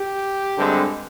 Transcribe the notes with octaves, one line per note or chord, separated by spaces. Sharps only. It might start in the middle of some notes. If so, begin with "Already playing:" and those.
Already playing: G4
G2 D3 G#3 C4